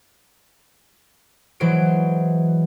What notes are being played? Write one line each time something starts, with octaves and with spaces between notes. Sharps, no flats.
E3 F#3 G#3 C5 D7